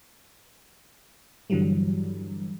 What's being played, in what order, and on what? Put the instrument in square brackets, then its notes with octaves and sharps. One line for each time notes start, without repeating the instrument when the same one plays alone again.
[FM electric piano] G2 D3 E3 F#3 G3